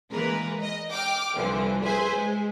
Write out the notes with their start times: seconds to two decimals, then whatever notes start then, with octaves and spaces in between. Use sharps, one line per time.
0.12 E3 G#3 A#3 A#4 B4
0.61 D#5
0.91 G5 D6 F6
1.34 C2 D3 E3 F3
1.82 G#4 B4 C5 E5 G#5
2.15 G#3